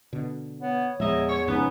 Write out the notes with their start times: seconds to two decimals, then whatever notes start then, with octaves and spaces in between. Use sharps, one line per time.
0.13 B2 D3
0.62 B3 C#5
1.00 E2 A#2 F3 G#3 D#4 D#5 E5
1.29 C#5
1.47 G#2 C3 F3 B3 C#4 D#4